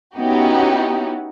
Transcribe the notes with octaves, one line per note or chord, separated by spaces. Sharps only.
B3 C#4 D#4 E4 F#4 G4